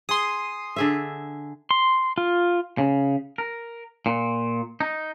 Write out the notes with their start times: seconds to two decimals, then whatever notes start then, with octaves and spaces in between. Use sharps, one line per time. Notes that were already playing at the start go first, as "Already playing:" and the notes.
0.09 G#4 C6 D#6
0.76 D3 G#4 E5
1.71 C6
2.18 F4
2.78 C#3
3.38 A#4
4.06 A#2
4.81 D#4